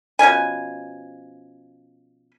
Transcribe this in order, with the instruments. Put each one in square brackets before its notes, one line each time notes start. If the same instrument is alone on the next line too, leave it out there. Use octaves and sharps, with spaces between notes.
[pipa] B2 F3 C#4 G#5